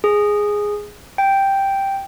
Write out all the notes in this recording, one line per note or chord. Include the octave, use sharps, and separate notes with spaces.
G#4
G5